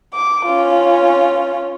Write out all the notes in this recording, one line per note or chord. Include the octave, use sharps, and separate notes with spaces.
D6
C#4 F4